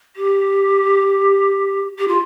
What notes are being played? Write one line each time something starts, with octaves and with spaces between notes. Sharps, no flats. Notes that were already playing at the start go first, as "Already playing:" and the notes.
G4
G4
F4